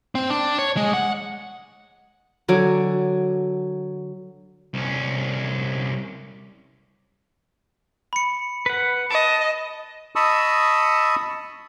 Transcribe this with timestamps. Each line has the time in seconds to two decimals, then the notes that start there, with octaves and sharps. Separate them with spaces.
0.15 C4
0.30 D4
0.59 C#5
0.77 G#3
0.94 F#5
2.48 D3 F#3 G#5 D6
4.74 C2 C#4
8.13 B5 C#7
8.66 B4 F#5
9.11 D#5 A5
10.15 D#5 A5 B5 C#6 D#6 E6